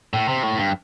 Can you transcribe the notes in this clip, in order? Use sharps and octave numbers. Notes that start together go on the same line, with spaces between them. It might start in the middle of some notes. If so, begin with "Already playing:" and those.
A2
C3
A2
G2